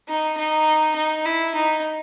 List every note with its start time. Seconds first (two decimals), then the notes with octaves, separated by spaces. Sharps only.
0.08 D#4
0.38 D#4
0.96 D#4
1.26 E4
1.55 D#4